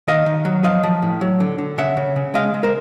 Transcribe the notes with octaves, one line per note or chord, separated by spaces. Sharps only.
D#3 D#5 F5
D#3
F#3
F3 D#5 F5
F3
A2
F#3
D3
D3
C#3 E5 F#5
C#3
C#3
G#3 D#5 F5
G#3
A#4 C5